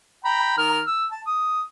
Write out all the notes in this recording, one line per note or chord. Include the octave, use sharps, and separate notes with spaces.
G5 A#5 B5
D#3 A#4 F6
E6
A5
D#6